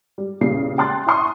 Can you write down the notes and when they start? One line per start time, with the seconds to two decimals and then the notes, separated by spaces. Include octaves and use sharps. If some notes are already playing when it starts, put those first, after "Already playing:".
0.18 G3
0.41 E2 A#2 C#3 G3 C7
0.78 G5 A5 C6 F#6 A6
1.06 E4 G#5 C6 C#6 D#6